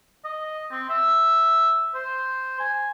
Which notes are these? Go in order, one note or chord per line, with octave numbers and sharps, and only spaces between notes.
D#5
C4
E5
C5
G#5